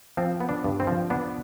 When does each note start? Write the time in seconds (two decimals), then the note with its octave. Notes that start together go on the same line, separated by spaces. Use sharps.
0.17 F3 C4
0.40 B3
0.49 D4
0.64 G2
0.80 C4
0.87 F3
1.10 B3 D4